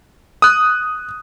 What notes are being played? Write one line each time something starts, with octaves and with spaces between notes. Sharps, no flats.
D#6 F#6